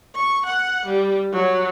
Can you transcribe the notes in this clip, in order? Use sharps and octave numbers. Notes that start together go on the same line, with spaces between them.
C#6
F#5
G3
F#3